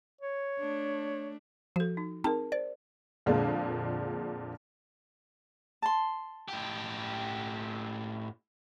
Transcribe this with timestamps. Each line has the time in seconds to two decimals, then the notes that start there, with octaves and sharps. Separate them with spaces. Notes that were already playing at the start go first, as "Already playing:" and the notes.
0.21 C#5
0.59 A3 D4
1.76 F3 F#4 A4
1.97 D#4
2.24 C4 D#4 G#4 A#4 A5
2.52 C5 D5
3.26 F2 A#2 D3 G#3 A#3 D4
5.82 A5 C6
6.48 A2 G4